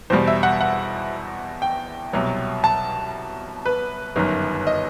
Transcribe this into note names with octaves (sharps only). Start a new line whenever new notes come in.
E2 B2 G3 C5
E5
F#5
F#5
G5
C2 B2 F#3
A5
B4
G1 F#2 D#3
D#5